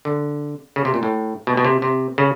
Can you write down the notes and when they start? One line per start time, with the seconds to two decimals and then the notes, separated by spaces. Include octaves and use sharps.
0.05 D3
0.76 C#3
0.85 C3
0.94 A#2
1.03 A2
1.47 B2
1.57 B2
1.64 C3
1.82 C3
2.18 C#3